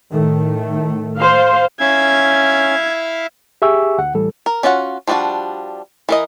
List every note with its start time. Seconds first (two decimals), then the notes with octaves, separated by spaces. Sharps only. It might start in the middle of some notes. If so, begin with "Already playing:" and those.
0.11 A2 D#3 A3
1.17 C5 F5
1.80 C#4 E4 E5 F5 G#6
3.62 G4 G#4 E5 G#5 C#6 E6
3.98 D2 F#5
4.14 A2 E3 G3 A4
4.46 A#4
4.63 C#4 D4 F4 F#4 F#5
5.07 F3 G3 D4 F4 F#4
6.09 E3 A#4 D#5